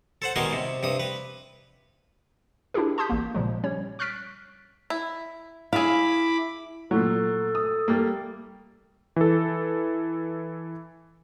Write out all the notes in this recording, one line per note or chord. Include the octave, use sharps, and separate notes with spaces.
A4 C5 F#5
B2 D#3 G3 G#3 D#5 C6
C3
G2 C3 D#6
B4
D4 E4 F4 G4 G#4 A#4
A5 C6 D6 D#6 G6 B6
A1 A#3
A#2 C#3 F3 G#3
G3 C#4 C#5
C#6 F6 F#6 A6 B6 D7
E4
E4 G#4 F5 B5 D6
A#2 F#3 A4
D#6
G3 A3 A#3
E3 A4